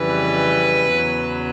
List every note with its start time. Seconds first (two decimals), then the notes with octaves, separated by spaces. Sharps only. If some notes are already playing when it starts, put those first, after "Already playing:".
Already playing: F2 C#3 E3 G3 B4
0.91 E2 C#3 F#3